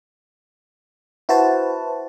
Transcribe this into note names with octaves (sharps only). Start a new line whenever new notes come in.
E4 F#4 B4 C5 A5